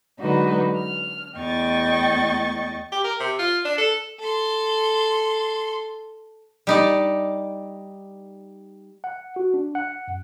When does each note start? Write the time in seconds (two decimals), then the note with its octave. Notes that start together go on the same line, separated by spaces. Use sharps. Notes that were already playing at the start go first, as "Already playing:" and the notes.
0.19 D3 F#3 G#3 D#4 F#4 B4
0.75 F6
1.38 E2 A3 D#5 G5 C#6 A6
2.92 G4
3.04 A#4
3.20 C3
3.39 F4
3.65 D4
3.78 A4
4.19 A4 C6
6.67 G3 D#4 D5
9.04 F#5
9.36 F#4
9.54 D4
9.75 F#5
10.08 F#2